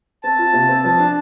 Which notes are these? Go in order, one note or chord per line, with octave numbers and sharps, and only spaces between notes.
C4 A5
F4
C3
C4
F3 A5
D4